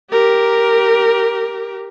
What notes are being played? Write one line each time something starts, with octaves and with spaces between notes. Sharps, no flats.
G4 A#4